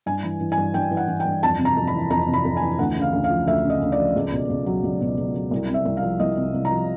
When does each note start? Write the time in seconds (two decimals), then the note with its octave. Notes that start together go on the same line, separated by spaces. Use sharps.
0.06 G2 G#5
0.24 E3
0.41 E3
0.52 G#5
0.57 G2
0.74 G2 G5
0.91 E3
0.97 F#5
1.08 E3
1.20 G5
1.25 G2
1.43 F2 A5
1.59 C3
1.65 A#5
1.77 F2
1.87 B5
1.94 E3
2.10 F2 A#5
2.28 C3
2.33 B5
2.45 F2
2.57 G#5
2.62 E3
2.79 D2 F#5
2.96 C#3
3.02 F5
3.13 D2
3.24 F5
3.30 F3
3.47 D2 E5
3.64 C#3
3.70 D#5
3.81 D2
3.92 D5
3.98 F3
4.16 C#2
4.32 B2
4.49 C#2
4.66 F#3
4.83 C#2
5.01 B2
5.17 C#2
5.35 F#3
5.51 C2
5.69 C3
5.74 E5
5.85 C2
5.97 F5
6.03 F3
6.20 C2 D#5
6.37 C3
6.54 C2
6.65 A#5
6.71 F3